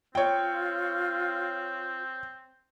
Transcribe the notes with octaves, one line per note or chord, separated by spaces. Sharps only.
C4 F4 C#5 G5